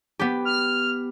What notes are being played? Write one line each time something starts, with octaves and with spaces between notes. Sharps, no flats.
B3 G4
F6